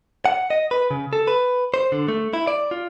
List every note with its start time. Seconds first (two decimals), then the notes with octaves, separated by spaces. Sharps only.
0.25 F#5
0.50 D#5
0.71 B4
0.91 C#3
1.13 A4
1.27 B4
1.74 C5
1.92 D3
2.08 A3
2.33 E4
2.47 D5
2.71 F4